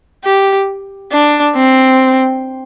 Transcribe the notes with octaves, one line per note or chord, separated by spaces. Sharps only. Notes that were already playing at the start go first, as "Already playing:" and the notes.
G4
D4
C4